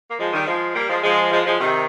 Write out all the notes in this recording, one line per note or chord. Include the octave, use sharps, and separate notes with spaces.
A#3
F3 G#3
D#3 G3
F3 G#3
G3 A#3
F3 G#3
F3 G#3
F3 G#3
F3 G#3
C3 D#3